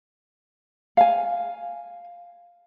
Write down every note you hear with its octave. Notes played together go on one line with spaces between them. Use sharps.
F5 G#5